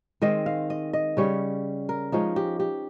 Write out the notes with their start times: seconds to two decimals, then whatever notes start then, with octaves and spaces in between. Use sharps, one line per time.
0.22 D#3 G#3 C4 D#5
0.46 F5
0.70 D#5
0.93 D#5
1.17 C#3 G3 C#4 C#5
1.89 A#4
2.12 F3 G#3 C#4 D#4
2.36 G4
2.60 G4